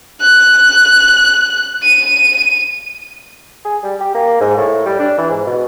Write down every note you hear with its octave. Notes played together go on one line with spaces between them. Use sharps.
F#6
D#7
G#4
G3
G4
A#3
G#2
A2
G3
D4
E3
G#2
B2